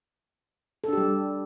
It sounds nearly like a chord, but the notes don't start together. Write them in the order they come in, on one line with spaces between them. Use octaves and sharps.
A4 D4 G4 G3